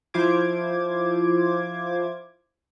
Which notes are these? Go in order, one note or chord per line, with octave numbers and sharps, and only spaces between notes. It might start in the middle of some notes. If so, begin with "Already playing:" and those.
F3 E4 F4 C5 D6 G#6